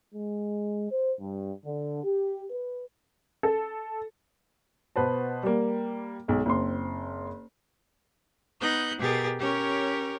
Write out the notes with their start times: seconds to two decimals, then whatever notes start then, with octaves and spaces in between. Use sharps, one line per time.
0.14 G#3
0.90 C5
1.19 G2
1.64 D3
2.04 G4
2.50 B4
3.43 A4
4.96 B2 B4 C5 A5
5.43 G3 A#3
6.28 B1 G#3
6.46 F#1 C4 C6
8.60 B3 D#4 F#6 G6
9.00 B2 G4 G#4 A#4 A6
9.40 C#4 G4 A#4 C#5